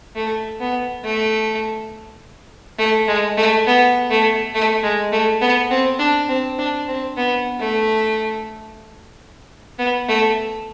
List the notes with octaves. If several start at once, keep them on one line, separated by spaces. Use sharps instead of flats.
A3
B3
A3
A3
G#3
A3
B3
A3
A3
G#3
A3
B3
C4
D4
C4
D4
C4
B3
A3
B3
A3